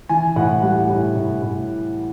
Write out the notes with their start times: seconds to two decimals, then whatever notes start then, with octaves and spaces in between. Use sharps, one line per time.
0.09 E3 G#5
0.36 A2 F#5
0.62 G3 F#5
0.90 A2
1.16 A2
1.42 A2